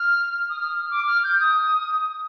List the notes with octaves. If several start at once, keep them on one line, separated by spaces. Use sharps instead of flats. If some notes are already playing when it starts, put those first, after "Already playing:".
Already playing: F6
D#6
F6
D6
F6
G6
D#6